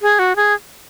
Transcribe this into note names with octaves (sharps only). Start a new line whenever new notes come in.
G#4
F#4
G#4